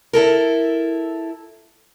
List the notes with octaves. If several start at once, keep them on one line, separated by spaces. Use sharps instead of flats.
E4 A4 A#4